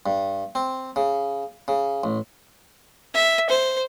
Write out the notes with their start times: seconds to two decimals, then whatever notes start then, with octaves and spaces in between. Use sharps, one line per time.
0.06 G2
0.55 C4
0.96 C#3
1.68 C#3
2.04 A1
3.14 E5
3.49 C5